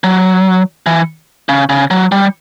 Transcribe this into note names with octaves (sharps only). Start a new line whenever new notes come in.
F#3
E3
C#3
C#3
F#3
G3